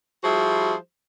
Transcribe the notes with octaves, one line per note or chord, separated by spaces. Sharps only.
F3 G3 E4 F#4 G#4 C5